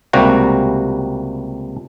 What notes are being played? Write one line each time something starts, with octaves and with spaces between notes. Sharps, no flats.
C#2 C3 G3 A#3 F#4 A#5